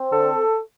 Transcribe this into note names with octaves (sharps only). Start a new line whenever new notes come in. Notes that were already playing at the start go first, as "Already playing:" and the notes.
Already playing: C4
D3 A4